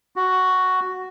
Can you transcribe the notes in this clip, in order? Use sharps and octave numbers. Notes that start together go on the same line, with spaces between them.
F#4